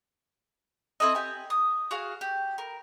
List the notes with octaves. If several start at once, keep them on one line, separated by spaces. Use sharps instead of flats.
C4 E4 A4 D#5
G4 G#5
D#6
F#4 G#4 F5
G4
A#4